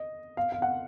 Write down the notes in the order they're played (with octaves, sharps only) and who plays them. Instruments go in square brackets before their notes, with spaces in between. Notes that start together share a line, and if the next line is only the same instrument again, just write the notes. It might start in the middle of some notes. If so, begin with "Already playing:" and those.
Already playing: [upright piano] D#5
F5
F5
F#5